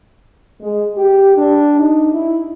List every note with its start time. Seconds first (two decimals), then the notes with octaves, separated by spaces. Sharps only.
0.61 G#3
0.97 G4
1.36 D4
1.78 D#4
2.14 E4